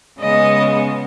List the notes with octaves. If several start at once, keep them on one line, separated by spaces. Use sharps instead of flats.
C#3 G#3 B3 D#5